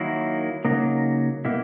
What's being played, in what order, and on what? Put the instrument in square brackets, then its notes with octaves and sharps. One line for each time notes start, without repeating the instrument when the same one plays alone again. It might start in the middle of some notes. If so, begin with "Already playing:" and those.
Already playing: [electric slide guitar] D#3 F#3 A#3 E4
C#3 F#3 A#3 D#4
B2 A#3 E4